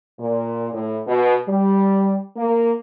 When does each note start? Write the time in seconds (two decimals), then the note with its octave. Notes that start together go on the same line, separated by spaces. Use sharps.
0.20 A#2
0.73 A2
1.07 B2
1.48 G3
2.37 A#3